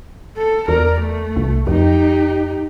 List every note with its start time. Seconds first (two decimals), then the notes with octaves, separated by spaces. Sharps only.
0.37 A4
0.68 E2 A#4 D5
1.00 A3
1.36 C2
1.67 F2 D#4 G4